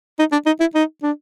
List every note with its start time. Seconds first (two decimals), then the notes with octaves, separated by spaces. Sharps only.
0.19 D#4
0.32 D4
0.46 D#4
0.60 E4
0.75 D#4
1.03 D4